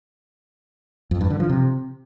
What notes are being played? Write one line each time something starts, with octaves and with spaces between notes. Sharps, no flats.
F2
G2
D3
F3
C3